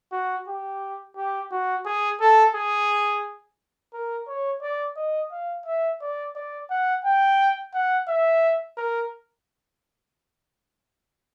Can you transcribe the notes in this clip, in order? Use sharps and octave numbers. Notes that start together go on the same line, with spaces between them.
F#4
G4
G4
F#4
G#4
A4
G#4
A#4
C#5
D5
D#5
F5
E5
D5
D5
F#5
G5
F#5
E5
A#4